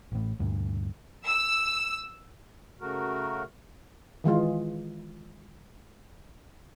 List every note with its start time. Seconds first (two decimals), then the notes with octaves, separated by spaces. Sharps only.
0.12 A1 A2
0.39 D2 G2 A#2
1.27 E6
2.80 C#3 A3 F#4 A#4
4.24 D#3 E3 G#3 F4